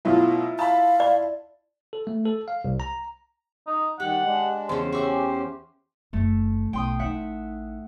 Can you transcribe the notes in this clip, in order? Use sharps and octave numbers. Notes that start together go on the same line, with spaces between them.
B2 F#3 A3 E4 F4
F5 A5 B5
D5
A4
A3
A4
F5
C2
A#5
D#4
D#3 G3 G4 F#5
G#3 D4
E2 C#3 C5
C#4 F#4 G4 E5 C6
F#1 D3 A3
B1 G5 C6 D#6
A1 D#4 E5 F#5